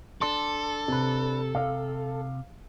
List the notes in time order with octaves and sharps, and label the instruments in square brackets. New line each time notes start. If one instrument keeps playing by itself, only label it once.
[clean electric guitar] D4 D5 C6 [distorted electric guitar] A4
[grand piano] C3 [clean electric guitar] D4 B4
[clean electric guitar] C3 [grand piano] F5